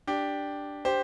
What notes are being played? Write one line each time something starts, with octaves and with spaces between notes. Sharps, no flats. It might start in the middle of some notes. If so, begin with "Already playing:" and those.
D4 G4
G4 C5